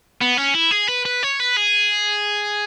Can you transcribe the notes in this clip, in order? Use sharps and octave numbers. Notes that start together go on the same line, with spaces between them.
B3
C#4
E4
G#4
B4
B4
C#5
B4
G#4